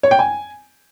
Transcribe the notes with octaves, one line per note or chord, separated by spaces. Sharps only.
C#5
G5
G#5